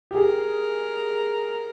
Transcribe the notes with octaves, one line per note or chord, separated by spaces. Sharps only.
G4
G#4 A#4